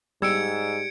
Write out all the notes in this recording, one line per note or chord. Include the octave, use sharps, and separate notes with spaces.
G#2 G3 E6 G#6 C#7 D7